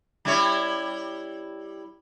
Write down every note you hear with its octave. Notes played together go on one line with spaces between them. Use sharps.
G3 E4 C#5